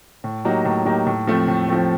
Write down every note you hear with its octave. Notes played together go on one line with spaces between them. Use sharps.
A2
F#3 A#3 D#4 G4
A2
F#3 A#3 D#4 G4
A2
F3 A3 C4
A2
F3 A3 C4